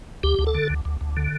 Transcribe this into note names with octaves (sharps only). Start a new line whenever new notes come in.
D2 G4
D2
A4
D3
D2
D2
D2
D3